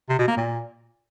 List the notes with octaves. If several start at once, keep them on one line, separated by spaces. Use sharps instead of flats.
C3
B2
A#3
A#2